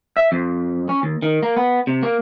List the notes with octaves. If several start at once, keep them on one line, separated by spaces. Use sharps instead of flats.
E5
F2
C#4
D#2
D#3
A#3
B3
C3
A#3